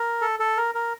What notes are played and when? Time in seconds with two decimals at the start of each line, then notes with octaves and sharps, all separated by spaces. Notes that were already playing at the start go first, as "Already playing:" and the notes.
Already playing: A#4
0.21 A4
0.39 A4
0.57 A#4
0.75 A#4